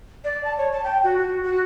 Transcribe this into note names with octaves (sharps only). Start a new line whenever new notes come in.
D5
A5
C#5
A5
G5
F#4
F#4
F#4